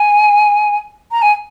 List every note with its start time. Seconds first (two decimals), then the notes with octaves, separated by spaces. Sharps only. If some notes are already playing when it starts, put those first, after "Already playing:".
Already playing: G#5
1.11 A#5
1.22 G#5